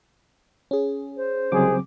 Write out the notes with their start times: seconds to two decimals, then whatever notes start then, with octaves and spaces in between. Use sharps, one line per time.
0.71 C#4 G#4
1.17 C5
1.52 C2 C#3 F#3 G#3 C4 G#4 D6